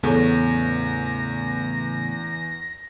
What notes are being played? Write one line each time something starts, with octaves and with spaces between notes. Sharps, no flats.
E2 A2 C#3 B3 G#4 A4 C#5 A#6